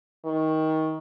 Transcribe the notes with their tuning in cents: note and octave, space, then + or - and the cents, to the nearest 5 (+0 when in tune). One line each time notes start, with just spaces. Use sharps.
D#3 +20